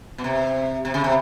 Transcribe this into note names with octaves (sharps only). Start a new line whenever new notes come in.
B2
C3
C3
C#3
C3